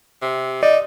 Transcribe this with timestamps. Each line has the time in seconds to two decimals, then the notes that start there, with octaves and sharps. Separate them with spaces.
0.22 C3
0.63 D#4 D5 D#5